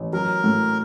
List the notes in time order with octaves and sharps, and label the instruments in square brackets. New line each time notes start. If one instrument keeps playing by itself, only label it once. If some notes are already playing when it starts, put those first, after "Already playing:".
Already playing: [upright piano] A1
[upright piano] F#3 [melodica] A#4
[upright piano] A2